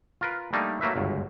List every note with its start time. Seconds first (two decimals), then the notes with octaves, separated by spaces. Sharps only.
0.21 F4 A#4 B4
0.53 G3 A3 A#3 D4 D#4
0.81 F#3 A3 A#3 B4 E5
0.96 G1 C#2 F#2